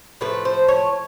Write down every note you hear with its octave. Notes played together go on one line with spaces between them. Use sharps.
A2 F3 A3 B4
C5
C#5